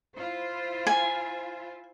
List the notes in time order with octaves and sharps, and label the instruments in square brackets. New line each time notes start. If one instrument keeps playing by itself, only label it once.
[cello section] E4 F4 C5
[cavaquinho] G#5